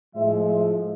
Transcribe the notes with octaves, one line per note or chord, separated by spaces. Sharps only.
A2 F3 G#3 E5
E5